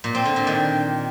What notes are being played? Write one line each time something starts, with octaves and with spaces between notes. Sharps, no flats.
A#2
C4
D3
A#2
D#3